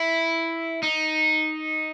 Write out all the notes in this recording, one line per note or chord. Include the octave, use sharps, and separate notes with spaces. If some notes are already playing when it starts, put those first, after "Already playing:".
Already playing: E4
D#4